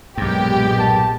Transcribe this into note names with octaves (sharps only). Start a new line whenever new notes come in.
B1 G2 A#2 G#3 B3 G4
A5